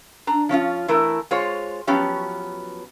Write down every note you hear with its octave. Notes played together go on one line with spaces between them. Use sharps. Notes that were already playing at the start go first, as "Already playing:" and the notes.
D4 A#5
F3 C#4 E4 F4
E3 A3 E4 A#4
G#3 F4 C5 C#5
F3 F#3 B3 C#4 G4